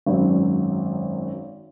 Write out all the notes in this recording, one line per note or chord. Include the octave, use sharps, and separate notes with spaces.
G#1 F#2 F#3